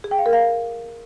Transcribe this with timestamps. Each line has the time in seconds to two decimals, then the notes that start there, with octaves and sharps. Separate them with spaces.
0.04 G#4
0.11 G5
0.19 F5
0.26 A#4
0.33 F5